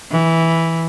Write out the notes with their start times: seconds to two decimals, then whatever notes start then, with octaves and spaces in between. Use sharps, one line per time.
0.11 E3